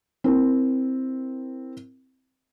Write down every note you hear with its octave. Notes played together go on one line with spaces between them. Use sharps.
C4 E4 A#4